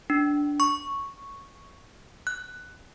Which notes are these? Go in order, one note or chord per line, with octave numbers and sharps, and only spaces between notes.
D4
C#6
F#6